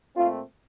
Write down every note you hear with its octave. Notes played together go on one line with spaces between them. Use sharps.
A#2 A3 C4 F4